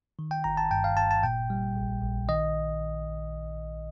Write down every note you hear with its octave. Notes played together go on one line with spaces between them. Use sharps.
D#3
G5
G1 A#5
A5
G2 G5
F5
G1 A5
A5
A#2 G5
G3
A#1
A#1
D#3 D#5